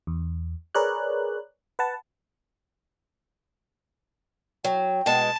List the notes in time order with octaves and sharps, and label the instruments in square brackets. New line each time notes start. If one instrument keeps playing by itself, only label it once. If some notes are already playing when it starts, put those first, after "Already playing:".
[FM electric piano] E2
G#4 A#4 B4 C#5 D5 F#6
B4 F#5 A5
[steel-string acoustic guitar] F#3 [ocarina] G5
[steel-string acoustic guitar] B2 G#3 [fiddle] A5